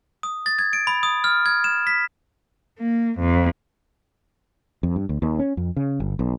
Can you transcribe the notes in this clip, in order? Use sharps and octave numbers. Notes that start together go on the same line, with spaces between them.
D#6
A6
G#6
D7
B5
D#6
F6
G#6
E7
B6
A#3
F2
F2
G2
D2
D#2
C#4
F2
C#3
G1
B1